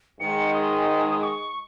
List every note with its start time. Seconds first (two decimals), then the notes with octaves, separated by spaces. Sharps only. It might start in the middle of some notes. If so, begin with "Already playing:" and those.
0.20 G#2 D#3 G#3 C#7
0.54 D#6
1.23 C#6